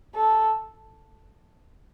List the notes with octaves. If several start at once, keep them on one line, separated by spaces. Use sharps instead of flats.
A4